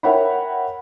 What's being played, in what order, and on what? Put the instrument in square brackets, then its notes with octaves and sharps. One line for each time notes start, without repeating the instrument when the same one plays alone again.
[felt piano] A#4 C#5 E5 F#5 G5 B5